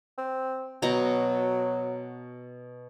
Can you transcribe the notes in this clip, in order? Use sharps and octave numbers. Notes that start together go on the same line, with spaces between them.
C4
B2 F#3 A#5